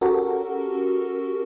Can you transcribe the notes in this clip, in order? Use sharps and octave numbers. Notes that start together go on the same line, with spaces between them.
C#4 F#4 G4 A4 A#4